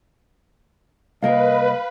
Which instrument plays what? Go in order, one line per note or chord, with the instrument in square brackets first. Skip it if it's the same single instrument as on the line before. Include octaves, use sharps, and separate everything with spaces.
[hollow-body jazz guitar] C2 A#3 A#4 [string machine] B4 [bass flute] D#5 [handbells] F5